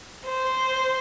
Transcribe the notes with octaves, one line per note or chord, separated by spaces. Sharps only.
C5